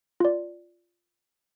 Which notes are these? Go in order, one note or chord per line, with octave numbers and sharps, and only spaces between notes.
F4 D5